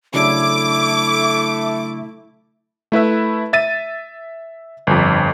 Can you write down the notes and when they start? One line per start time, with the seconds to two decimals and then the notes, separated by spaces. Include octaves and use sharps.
0.14 C#3 F#3 A3 D4 E4 D6
2.92 A3 E4 B4 E5
3.53 E5 A6 D#7
4.87 G1 F2